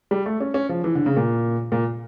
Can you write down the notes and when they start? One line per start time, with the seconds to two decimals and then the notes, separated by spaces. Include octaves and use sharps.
0.11 G3
0.26 A3
0.40 C#4
0.54 C#4
0.69 F3
0.84 E3
0.95 D3
1.06 C#3
1.17 A#2
1.72 A#2